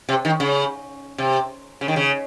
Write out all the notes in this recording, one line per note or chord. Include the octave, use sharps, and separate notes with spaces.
C3
D#3
C#3
C3
C#3
D#3
C#3